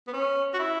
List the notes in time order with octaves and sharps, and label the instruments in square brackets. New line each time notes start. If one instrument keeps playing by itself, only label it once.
[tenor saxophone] B3
C#4
F#4
E4